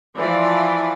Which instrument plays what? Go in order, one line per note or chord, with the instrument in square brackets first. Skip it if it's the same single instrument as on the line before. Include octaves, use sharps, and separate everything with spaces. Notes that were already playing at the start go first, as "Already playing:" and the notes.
[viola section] E3 F3 D5